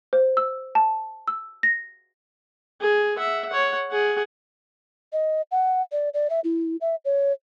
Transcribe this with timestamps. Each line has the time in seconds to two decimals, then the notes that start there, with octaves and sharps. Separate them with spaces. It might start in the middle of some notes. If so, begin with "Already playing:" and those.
0.13 C5
0.37 E6
0.75 A5
1.28 E6
1.63 A#6
2.81 G#4
3.17 E5 F#5
3.49 C#5 F#5
3.91 G#4 F#5
5.13 D#5
5.52 F#5
5.92 D5
6.14 D5
6.30 E5
6.44 E4
6.81 E5
7.05 C#5